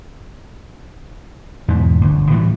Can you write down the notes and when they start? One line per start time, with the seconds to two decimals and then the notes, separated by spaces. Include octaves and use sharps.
1.68 E2 G#2 B2 E3
2.01 G1 D2
2.30 A2 E3 G3